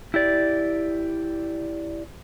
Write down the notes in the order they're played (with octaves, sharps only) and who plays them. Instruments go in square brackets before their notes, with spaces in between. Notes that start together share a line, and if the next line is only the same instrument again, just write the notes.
[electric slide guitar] E4 G4 D5